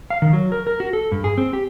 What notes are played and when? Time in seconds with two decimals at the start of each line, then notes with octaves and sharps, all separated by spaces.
0.10 F5
0.22 D#3
0.33 F#3
0.52 A#4
0.67 A#4
0.80 F#4
0.93 A4
1.12 G2
1.24 G#4
1.38 C4
1.53 G4